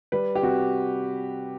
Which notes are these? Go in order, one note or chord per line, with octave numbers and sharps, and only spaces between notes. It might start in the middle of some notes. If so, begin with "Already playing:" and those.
G3 B4
G4
C3 F#4